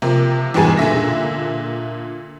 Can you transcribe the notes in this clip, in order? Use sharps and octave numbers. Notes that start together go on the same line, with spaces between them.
C3 F3 A#3
E2 G#2 B2 G3 G#4 G#5
A#2 D3 E5 A#6